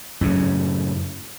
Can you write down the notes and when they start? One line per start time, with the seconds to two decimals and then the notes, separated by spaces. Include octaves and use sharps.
0.21 F#2 A2 C#3